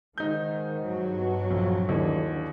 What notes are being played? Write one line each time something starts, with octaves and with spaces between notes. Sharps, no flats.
G#2 D#3 D#4 G6
G2 F#3
B2
A#1 F2
D#2 D3 E3